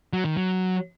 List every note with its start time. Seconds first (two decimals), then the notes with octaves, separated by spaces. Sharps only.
0.13 F#3
0.25 D#3
0.37 F#3